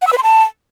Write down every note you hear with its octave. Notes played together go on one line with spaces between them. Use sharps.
F#5
E6
B4
C6
A5